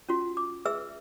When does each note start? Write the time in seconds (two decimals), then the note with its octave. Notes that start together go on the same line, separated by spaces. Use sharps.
0.09 C#4 F4 F#4
0.37 D6
0.65 G#4 B4 E5 E6